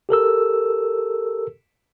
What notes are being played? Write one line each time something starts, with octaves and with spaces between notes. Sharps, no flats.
G4 A4 A#4 E6